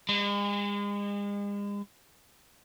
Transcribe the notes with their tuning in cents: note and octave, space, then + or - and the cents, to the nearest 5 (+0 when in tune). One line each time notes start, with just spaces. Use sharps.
G#3 -40